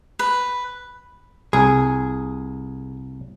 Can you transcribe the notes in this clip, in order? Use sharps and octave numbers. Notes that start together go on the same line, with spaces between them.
B4
C2 G#4